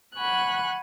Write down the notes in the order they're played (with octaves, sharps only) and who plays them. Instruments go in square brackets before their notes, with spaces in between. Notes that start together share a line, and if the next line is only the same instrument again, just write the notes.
[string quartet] F#5 G#5 B5 C#6 F#6